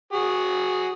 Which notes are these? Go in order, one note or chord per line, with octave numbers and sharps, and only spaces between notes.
F#4 G#4